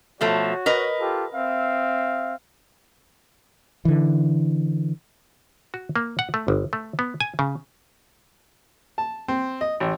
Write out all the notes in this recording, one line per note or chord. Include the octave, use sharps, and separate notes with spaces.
B2 F3 A3 F#4 C#5
A#4 B4 D#5
F4 G4 A4
C4 E5 F5
D3 E3
F#4
A#3
F#5
A3
G1
A3
B3
G#5
C#3
A5
C4
D#5
A1